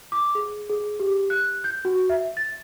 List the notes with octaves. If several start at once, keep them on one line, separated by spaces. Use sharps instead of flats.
D6
G#4
G#4
G4
F#6
G6
F#4
E5
A6